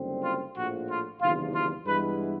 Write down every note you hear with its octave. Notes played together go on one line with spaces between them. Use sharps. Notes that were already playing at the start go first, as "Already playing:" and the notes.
Already playing: F#1 F#2 D3 G3 C4
F4
A#1 A2 F3 F#4
F4
F#1 E2 C3 D#3 F4
F4
G2 E3 G#3 B3 E4 B4